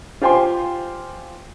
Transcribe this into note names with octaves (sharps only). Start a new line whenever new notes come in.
F4 G4 C5 G5 G#5 C6